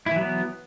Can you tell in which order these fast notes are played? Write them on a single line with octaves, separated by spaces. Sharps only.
E4 E3 F#3 B3